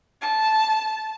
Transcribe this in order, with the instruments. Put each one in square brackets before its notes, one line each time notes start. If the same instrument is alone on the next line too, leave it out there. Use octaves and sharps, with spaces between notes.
[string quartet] A5